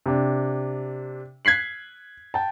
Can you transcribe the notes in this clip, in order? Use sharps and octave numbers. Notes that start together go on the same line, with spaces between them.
C3 D4
F#6 G#6 B6 C7 F#7
G5 A5